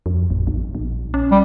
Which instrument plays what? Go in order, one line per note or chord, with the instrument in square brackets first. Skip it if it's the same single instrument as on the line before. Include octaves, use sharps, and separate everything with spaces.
[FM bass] F2
A1
A#1
A#1
C#4
[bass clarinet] G3